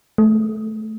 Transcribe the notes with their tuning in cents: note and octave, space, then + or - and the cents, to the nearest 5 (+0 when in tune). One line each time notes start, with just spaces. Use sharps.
A3 -20